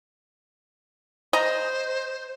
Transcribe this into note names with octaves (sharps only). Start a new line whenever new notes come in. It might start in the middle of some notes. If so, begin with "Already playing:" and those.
C5 D#5 A#5